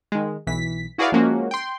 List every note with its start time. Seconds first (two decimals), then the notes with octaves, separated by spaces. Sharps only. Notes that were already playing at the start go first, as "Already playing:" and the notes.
0.12 D#3 G#3
0.47 B1 E3 B6
0.98 E4 F#4 G#4 B4 D5 F5
1.12 F3 G#3 A#3 C#4 F#4
1.51 G5 C6